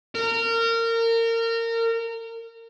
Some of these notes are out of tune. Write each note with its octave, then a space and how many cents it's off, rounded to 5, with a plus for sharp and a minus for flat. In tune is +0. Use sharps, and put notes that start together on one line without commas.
A#4 -25